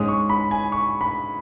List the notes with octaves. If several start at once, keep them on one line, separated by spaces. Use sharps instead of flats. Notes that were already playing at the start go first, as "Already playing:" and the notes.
Already playing: G#2 G#3 C#4 D#6
C#6
B5
G#5
C#6
B5